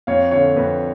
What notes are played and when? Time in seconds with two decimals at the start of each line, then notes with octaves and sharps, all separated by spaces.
0.07 F2 C#5 F5
0.31 D3 C#5 F5
0.56 F2 B4